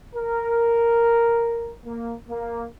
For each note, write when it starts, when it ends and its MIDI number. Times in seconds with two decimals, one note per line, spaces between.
0.14 1.74 70
1.85 2.14 58
2.29 2.65 58